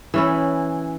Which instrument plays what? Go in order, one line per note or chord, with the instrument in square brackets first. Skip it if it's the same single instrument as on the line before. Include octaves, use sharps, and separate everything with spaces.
[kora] E3 C#4 E4